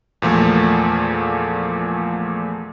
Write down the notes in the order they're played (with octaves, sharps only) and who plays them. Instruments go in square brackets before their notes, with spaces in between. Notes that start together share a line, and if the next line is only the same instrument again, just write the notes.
[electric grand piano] E2 A#2 F3 A3